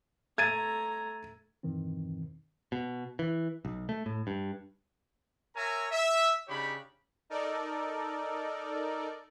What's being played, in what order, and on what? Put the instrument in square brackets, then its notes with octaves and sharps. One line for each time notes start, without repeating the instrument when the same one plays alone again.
[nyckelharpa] A3 A#5 [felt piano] G#6 A6 D#7
[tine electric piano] E2 G2 B2 D#3 E3 C4
[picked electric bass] B2
E3
B1
A3
A2
G2
[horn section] A#4 C#5 E5 G#5 A#5
E5
C#3 D4 D#4 G4 C#5 B5
[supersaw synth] D#4 A4 A#4 D5